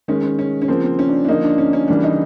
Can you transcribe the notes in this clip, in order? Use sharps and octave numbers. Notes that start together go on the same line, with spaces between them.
D#3 G#3 C#4
C#4
C#4
C#4
C#3 F3 A#3 C4
C4
C#4
D4
D4
D3 F3 A#3 D#4
D4
C#4
C#4
C#3 E3 G3 A#3 D4
D#4